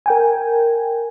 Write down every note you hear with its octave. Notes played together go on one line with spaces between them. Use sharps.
A#4 G5 G#5